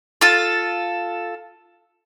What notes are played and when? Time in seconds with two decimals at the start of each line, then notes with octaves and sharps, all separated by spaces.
0.21 F4 A4